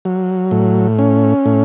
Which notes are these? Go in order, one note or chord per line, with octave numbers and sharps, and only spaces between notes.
F#3
A2
C#4
A2